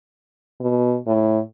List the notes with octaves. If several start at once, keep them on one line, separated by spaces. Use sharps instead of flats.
B2
A2